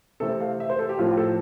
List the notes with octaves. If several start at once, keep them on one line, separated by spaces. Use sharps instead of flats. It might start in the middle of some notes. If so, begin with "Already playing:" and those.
C3 E3 A3 C4 A4
F5
E5
C5
A4
G4
A2 F3 C4 F4
G4
A4